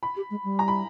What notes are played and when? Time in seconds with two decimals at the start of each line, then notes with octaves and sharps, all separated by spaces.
0.03 B5
0.16 G4
0.30 G#3
0.44 G3
0.59 A#5
0.68 B5